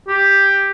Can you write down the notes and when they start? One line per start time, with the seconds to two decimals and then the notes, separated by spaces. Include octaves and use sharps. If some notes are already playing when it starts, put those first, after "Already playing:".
0.08 G4